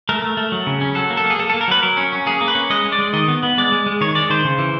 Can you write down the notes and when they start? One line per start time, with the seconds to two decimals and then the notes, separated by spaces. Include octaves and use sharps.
0.09 A3 A#4
0.22 A3
0.37 A3
0.52 F#3
0.67 C#3
0.81 C#4
0.95 F#3 A4
1.10 A#3
1.17 A4
1.25 A#3
1.30 G#4
1.39 A#3 A4
1.50 A4
1.54 A#3
1.61 A#4
1.68 F#3 B4
1.82 F#3 A#4
1.97 C#4
2.12 C#4
2.26 A#3 G#4
2.41 A#3
2.48 B4
2.55 C#4
2.70 G#3 D#5
2.85 G#3
2.92 D5
2.99 G#3
3.13 D#3 D#5
3.28 B3
3.43 B3
3.58 G#3 D5
3.72 G#3
3.86 G#3
4.01 D#3 C#5
4.15 G#3 D5
4.30 D#3 C5
4.45 C#3
4.59 E3